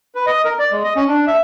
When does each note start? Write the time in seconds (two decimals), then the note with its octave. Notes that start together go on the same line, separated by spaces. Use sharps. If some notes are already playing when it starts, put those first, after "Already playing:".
0.15 B4
0.26 D#5
0.45 A#4
0.59 D5
0.72 G#3
0.84 D#5
0.96 C#4
1.08 D4
1.27 E5